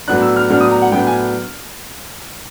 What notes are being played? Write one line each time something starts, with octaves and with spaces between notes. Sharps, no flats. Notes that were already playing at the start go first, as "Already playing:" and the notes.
A2 F#3 B3 D4 F#6
E6
F6
A2 F#3 B3 D4 F6
D#6
A#5
F#5
A2 F#3 B3 D4 G5
G#5